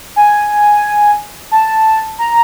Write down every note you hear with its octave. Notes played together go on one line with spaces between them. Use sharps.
G#5
A5
A#5